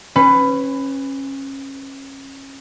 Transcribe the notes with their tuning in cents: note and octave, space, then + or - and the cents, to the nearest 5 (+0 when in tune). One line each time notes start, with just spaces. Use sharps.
C#4 -25 B4 +15